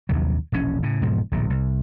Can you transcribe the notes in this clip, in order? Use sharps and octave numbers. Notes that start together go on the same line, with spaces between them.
A#1 D#2 C3 F#3
E1 A#1 G#2 C#4
A2 C#3
E1 G#2 B2 F3
D1 A#1 A#2
C2